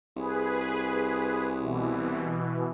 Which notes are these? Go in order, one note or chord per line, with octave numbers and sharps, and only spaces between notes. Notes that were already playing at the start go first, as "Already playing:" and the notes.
C2 G#4 B4
B2 E3